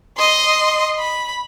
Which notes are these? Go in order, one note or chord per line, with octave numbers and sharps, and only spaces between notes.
D#5 C6
B5